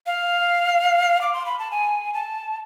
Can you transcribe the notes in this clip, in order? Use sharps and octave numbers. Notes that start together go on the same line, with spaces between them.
F5
D6
C6
B5
A5
G#5
A5